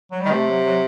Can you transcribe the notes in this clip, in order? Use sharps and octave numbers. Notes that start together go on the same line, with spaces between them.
F#3
G3
D#3
C3 A3
F#3
F#3